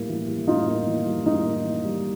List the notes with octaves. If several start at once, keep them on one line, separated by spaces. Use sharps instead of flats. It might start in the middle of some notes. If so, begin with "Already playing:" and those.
Already playing: A2 G3 A#3
E3
G3
A2 D#4 F4
A#3
E3
G3
A2 D#4
A#3
E3
G3